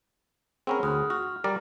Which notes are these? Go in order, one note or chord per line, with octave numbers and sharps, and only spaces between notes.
C4 C#4 G#4 A#4 F#5 B5
D2 D#6 F6 F#6
F#4 F6
G3 A#4 D5